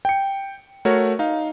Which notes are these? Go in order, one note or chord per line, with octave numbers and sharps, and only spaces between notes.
G5 C#7
A3 F#4 A#4 C#5
D#4 F5